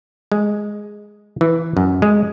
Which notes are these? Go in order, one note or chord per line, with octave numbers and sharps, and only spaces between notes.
G#3
E3
F#2
G#3